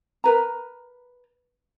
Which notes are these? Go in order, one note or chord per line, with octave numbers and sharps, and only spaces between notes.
A#4 B4 A#5